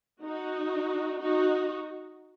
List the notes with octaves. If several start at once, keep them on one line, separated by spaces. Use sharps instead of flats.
D#4 F#4
D#4 F#4